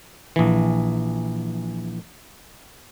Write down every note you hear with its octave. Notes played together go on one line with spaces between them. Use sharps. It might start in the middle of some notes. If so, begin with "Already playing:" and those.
A#1 E3